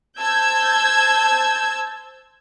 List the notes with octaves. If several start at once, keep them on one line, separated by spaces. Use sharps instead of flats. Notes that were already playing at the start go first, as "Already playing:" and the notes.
C5 A5 E6 G6 G#6